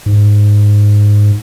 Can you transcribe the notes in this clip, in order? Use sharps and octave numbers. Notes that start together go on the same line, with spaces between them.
G#2